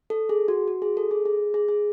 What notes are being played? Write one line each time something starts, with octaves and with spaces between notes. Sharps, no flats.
A4
G#4
F#4
F#4
G#4
A4
G#4
G#4
G#4
G#4